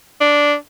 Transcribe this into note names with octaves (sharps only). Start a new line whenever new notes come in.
D4